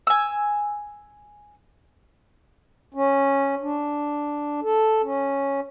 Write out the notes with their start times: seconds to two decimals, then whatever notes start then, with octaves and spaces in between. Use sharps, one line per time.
0.07 G#5 E6
2.94 C#4
3.62 D4
4.63 A4
5.03 C#4